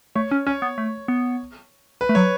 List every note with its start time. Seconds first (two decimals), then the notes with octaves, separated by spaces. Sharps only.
0.15 A3 C#5
0.31 C#4
0.47 C#4 C#5
0.62 B3
0.78 A3
1.08 B3
2.01 B4
2.09 A3
2.15 F#3 C#5